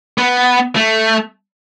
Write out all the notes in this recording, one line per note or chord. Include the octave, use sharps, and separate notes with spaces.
B3
A3